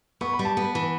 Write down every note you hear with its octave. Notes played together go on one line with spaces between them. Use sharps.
B3 C#6
B5
G3
A5
B3
E3